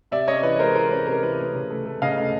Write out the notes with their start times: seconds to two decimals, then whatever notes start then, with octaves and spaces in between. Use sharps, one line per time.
0.11 C3 D5 E5
0.27 C#4 C#5 D#5
0.43 E3 B4 C#5
0.59 G#3 A#4 C5
0.75 E3 A#4 C5
0.91 C#4 B4
1.07 C3 A#4
1.23 E3 B4
1.39 A3
1.54 C#3
1.70 A3
1.86 A3
2.02 C#3 D#5 F5
2.17 A3